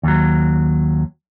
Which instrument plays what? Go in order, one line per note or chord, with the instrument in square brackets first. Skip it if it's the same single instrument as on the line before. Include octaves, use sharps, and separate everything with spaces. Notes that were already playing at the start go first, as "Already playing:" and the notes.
[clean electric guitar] D#2 F#3